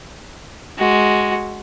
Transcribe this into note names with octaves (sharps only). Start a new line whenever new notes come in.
G#3 F#4